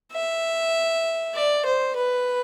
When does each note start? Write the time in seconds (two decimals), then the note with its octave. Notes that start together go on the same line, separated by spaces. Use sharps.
0.12 E5
1.34 D5
1.65 C5
1.95 B4